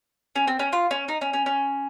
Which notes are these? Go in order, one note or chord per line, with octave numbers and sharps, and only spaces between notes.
C#4
C4
C#4
F4
C#4
D#4
C#4
C#4
C#4